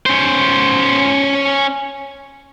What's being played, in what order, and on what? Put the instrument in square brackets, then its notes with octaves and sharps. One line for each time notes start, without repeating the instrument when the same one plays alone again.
[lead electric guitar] C#4 C5